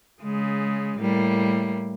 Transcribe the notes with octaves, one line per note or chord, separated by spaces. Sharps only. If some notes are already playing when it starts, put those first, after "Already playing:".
C#3 G#3
A2 G3 A#3